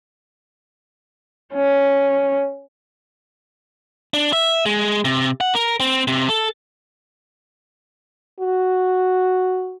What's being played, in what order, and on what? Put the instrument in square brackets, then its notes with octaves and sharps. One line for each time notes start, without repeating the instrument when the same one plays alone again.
[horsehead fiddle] C#4
[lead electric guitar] D4
E5
G#3
C3
F#5
A#4
C4
C3
A4
[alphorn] F#4